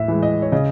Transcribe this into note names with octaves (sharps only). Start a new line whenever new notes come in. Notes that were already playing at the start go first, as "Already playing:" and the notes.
Already playing: A2 E5
E3 G#3
D#5
C#5
C#3 D#5